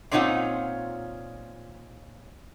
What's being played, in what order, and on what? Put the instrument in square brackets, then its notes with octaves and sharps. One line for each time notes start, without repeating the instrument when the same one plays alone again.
[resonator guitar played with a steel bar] A#2 C4 C#4 D#4 F4 F#5